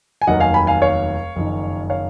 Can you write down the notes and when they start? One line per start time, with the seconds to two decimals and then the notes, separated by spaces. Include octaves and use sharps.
0.22 G#5
0.27 F1 D#2 D#3 F#3 D#5 F#5
0.40 F5 G#5
0.54 G#5 B5
0.67 F5 G#5
0.82 C#5 F5
1.36 F#1 F2 D#3
1.90 C#5 F5